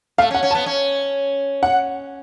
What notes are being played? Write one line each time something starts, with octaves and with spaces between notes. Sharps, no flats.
A3 F5
C#4
F#5
C#4
A5
B3
C#4
F#5